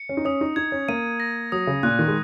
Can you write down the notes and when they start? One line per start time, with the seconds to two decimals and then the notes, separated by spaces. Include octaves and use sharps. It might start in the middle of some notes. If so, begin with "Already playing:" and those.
Already playing: C#7
0.09 C#4
0.17 D#4
0.25 C#4 D#6
0.41 D#4
0.56 D#4 G#6
0.72 C#4
0.89 A#3 D#7
1.20 A#6
1.52 F#3 D#6
1.67 C#3
1.83 A#2 F#6
1.99 D#3
2.08 G#3